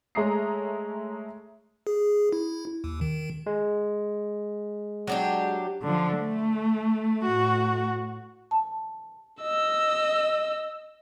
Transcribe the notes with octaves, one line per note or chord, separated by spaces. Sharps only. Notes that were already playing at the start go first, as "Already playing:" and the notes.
G#3 A3 C#5 A#5 D#6 C7
G#4
E4
D#2
D#3
G#3
F#3 D4 G4
D3 F3
A3
A2 F#4
A5
D#5 E6